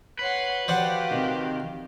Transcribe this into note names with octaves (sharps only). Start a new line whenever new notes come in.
B4 C#5 F#5 C6
F#4 G4 C5 D5 F5 F#5
C3 D#3